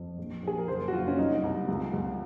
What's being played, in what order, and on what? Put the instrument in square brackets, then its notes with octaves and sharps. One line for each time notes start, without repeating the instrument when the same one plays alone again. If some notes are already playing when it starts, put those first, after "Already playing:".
Already playing: [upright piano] F2
A#1
A#1 G#4
A#4
F#1 C5
F#4
F#1 F4
C#4
C2 D#4
C2
C#2
C#2